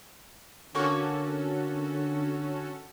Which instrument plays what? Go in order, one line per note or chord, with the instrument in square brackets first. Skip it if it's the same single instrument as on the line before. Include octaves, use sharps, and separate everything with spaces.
[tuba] D3 [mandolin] A#3 C#6 F6 [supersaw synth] C#4 F#4 A4